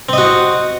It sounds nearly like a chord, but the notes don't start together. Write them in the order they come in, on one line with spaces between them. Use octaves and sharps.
C4 D#5 F#4